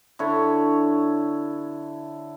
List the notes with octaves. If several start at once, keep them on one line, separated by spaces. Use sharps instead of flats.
D3 E4 C#5